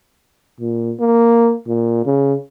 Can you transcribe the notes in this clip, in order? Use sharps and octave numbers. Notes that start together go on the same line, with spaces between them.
A#2
A#3
A#2
C#3